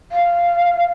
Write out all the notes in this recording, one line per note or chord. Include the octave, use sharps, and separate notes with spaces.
F5